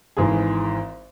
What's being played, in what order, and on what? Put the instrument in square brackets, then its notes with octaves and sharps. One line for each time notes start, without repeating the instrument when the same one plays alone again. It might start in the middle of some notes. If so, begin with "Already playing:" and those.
[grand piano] G#1 G#2 E3 G#4